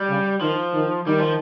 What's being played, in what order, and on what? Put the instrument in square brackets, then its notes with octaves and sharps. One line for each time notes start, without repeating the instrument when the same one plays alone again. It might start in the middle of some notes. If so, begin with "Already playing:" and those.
Already playing: [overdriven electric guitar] G3
[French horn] C#3
[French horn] D#3 [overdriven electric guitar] F3
[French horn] D#3
[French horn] D#3 [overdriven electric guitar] G3
[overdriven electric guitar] F3